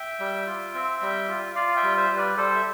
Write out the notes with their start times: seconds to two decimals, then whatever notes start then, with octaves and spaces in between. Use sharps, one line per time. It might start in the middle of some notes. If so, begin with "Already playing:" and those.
Already playing: E5 G5
0.19 G3
0.46 F4
0.75 C4
1.02 G3
1.28 F4
1.55 F4 D5 F5
1.76 E5 G5
1.83 G3
1.97 C5 E5
2.10 G3
2.17 B4 D5
2.37 G3 A4 C5
2.55 E5